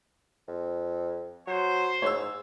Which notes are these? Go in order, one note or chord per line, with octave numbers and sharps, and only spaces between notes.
F2
F#3 C5
G#2 C#5 E6